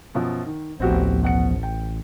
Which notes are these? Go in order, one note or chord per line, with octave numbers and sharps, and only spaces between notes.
F#2 B2 F3
D#3
A1 D2 F3 B3 C4 F#4 G4
B2 F#5 C#7
G5